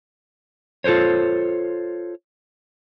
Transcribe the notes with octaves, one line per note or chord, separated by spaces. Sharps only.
F4 A4 A#4 C5 C#5